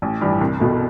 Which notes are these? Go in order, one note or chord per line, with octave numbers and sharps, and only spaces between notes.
A1
G2 E3 G3
C2
B2 A3